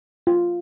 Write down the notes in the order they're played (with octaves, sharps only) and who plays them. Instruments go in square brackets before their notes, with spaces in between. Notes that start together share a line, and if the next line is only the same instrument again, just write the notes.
[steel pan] F4